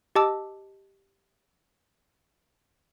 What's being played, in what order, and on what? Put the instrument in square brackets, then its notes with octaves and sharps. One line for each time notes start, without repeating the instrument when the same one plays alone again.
[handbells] G4 D#5 A5 D6 E6